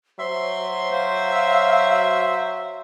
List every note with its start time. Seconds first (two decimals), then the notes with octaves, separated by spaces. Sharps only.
0.19 F#3 C5 E5 C6
0.91 C5 F5